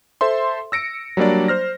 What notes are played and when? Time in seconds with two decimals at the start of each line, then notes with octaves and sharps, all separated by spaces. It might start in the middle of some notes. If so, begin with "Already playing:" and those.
0.21 A4 C5 E5 C6
0.72 E6 A#6 C#7 D7
1.17 F#3 G3 A#3 D4 D5
1.48 C5 F6 A#6